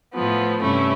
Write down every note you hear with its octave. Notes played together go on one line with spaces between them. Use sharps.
A2 F3 B3
G2 C3 A3 C#4 E4